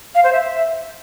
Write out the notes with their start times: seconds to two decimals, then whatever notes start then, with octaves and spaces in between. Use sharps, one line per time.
0.15 F5
0.24 C5
0.33 E5